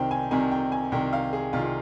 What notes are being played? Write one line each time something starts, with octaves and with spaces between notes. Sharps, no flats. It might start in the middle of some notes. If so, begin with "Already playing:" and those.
Already playing: C2 C3 D#3 C5 G5
G#5
C2 C3 D#3 G#5
G5
G#5
C2 C3 D#3 G5
F5
G#4
C2 C3 D#3 F4
F4